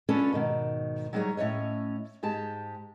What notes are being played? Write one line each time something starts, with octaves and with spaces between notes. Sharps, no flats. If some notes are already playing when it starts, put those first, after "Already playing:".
C#4 D4 F4 A4 B4 C#5
G#2 B2 D#3
F#3 G3 D#4 G#4 C#5
A2 A3 C#4 C#5 D#5
G#2 G#3 G4 A5